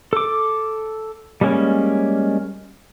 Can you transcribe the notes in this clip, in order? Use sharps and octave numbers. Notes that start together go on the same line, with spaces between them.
A4 D6
G3 G#3 A#3 C#4